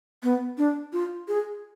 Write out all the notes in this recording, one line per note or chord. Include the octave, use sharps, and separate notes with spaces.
B3
D4
F4
G#4